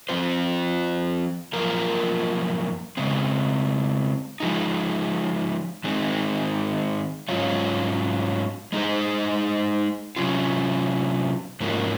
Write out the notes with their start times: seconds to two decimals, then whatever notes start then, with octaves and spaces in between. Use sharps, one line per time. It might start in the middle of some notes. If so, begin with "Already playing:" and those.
0.09 F3 C4 F4 C5
1.53 F#2 F3 A#3 F4 A#4
2.97 C#3 G#3 C4
4.40 F3 G#3 D#4
5.84 D#3 G#3 C4
7.28 G#2 F#3 C#4 F4
8.72 G#3 D#4 G#4 C5
10.16 C3 F#3 C#4 F4
11.60 G#2 F3 A#3 C#4 F#4